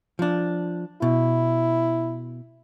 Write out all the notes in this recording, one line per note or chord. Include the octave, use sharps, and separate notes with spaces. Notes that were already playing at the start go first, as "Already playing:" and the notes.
F3 D4
B2 E4